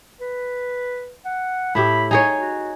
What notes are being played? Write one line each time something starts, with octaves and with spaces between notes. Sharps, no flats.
B4
F#5
A2 E4 G4 B5
D#4 G#4 C#5 G#5
F#4